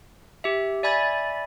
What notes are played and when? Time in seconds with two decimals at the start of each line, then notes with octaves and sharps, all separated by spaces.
0.44 G4 E5
0.83 D5 E5 G#5 B5 G#6 A6